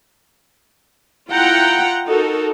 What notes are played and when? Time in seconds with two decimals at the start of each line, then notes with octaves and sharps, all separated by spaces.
1.30 E4 F4 F#5 G5 A#5
2.06 D#4 F#4 A4 A#4